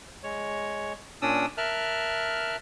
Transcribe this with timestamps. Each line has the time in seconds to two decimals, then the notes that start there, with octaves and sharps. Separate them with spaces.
0.23 G#3 C#5
1.22 A#2 C#4 D4 D5 D#6 E6
1.57 A#4 E5 A5 F6 F#6